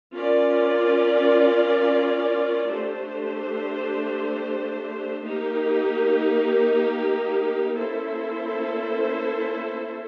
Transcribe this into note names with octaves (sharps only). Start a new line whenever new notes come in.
C#4 F4 A#4 D5
A3 D4 G4 C5
A#3 D#4 G4 A#4
A#3 C#4 E4 A4 C5